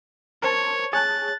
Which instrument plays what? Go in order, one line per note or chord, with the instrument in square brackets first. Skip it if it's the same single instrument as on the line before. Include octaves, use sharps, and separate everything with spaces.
[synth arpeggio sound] A#4 C5 A5 [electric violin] C#5
[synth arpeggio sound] G#4 C#5 A5 [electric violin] F#6 A6